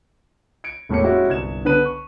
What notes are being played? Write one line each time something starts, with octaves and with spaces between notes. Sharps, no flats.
G#6 C#7 D7
E1 A2 A3 A#3 C#5 C#7
G#3 C#4 E4 F#4 G4
G1 C2 G#6 E7
D3 B3 B4 D#7
C#6